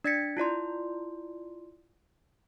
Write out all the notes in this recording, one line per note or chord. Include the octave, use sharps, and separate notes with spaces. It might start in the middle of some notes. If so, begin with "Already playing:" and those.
D4 D5 G#6 A6 B6 C#7
E4 F4 D5 C6